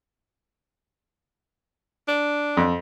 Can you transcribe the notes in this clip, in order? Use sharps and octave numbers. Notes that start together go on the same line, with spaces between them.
D4
F2